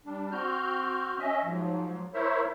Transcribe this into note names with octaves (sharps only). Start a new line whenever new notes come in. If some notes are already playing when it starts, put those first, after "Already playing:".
G3 D4
C4 F#4 F6 G6
C#4 D#5 E5
G#2 F3 F#3
E4 A#4 C5 C#5 E5